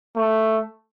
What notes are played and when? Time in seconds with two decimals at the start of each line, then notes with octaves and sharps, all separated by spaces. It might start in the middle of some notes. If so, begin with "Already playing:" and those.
0.16 A3